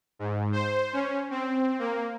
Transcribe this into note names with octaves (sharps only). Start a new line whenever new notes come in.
G#2
C5
C#4
C4
A#3